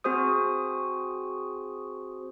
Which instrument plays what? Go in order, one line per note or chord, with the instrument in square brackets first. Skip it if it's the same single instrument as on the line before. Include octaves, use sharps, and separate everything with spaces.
[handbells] C4 F#4 G#4 C5 D#6